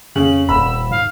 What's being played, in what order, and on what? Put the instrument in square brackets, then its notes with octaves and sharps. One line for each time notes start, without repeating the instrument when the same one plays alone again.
[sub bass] F2 [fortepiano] C#3 [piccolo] F#7
[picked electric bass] D#1 [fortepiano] B5 [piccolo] E6
[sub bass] G#2 [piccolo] F5